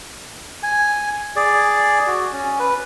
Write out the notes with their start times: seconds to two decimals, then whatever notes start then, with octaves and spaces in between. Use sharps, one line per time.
0.63 G#5
1.36 G#4 D5
2.07 F#4
2.32 C#4
2.59 B4